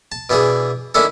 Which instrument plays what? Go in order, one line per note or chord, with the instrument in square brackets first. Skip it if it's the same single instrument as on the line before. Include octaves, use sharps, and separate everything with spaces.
[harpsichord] A5
B2 E3 D4 G#4
D#3 C#4 D4 E4 A4